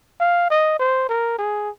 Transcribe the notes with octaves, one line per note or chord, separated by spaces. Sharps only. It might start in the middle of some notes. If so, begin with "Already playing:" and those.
F5
D#5
C5
A#4
G#4